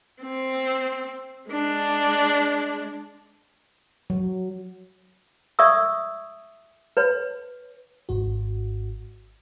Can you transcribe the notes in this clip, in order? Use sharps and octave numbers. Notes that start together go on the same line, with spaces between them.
C4
G#3 D4
F#3
D5 E5 C#6 D#6 E6
B4 C#5
G#1 G#2 F#4